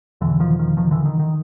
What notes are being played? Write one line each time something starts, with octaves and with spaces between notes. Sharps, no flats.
E2 B2 D3 E3
D#3 F3
D#3 F3
D#3 F3
D3 E3
D#3
D#3